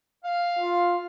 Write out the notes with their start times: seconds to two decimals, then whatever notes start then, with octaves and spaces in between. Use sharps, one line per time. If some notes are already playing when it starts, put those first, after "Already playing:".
0.24 F5
0.59 F4